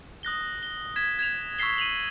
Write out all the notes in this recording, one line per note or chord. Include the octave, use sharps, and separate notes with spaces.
D#6 F#6 A#6 G7
G7
G#6 B6 E7
G#6 E7 F7
C#6 E6 G#6 B6 C7 G7
D#7 F7 F#7